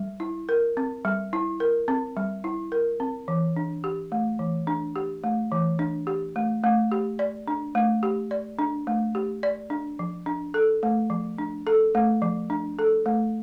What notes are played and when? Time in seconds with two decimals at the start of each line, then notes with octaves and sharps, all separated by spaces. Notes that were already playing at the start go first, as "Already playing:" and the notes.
Already playing: G3
0.20 E4
0.49 A#4
0.77 C4
1.05 G3
1.33 E4
1.60 A#4
1.88 C4
2.17 G3
2.44 E4
2.72 A#4
3.00 C4
3.28 E3
3.57 D4
3.84 G4
4.12 A3
4.39 E3
4.67 D4
4.96 G4
5.24 A3
5.52 E3
5.79 D4
6.07 G4
6.36 A3
6.64 A3
6.92 G4
7.19 D5
7.48 D4
7.75 A3
8.03 G4
8.31 D5
8.59 D4
8.87 A3
9.15 G4
9.43 D5
9.70 D4
9.99 F3
10.26 D4
10.54 A4
10.83 A3
11.10 F3
11.38 D4
11.67 A4
11.95 A3
12.22 F3
12.50 D4
12.79 A4
13.06 A3